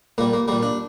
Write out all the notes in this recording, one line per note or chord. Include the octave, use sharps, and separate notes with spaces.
A#2 G3 A#3
A#3
A#2 G3 A#3
D4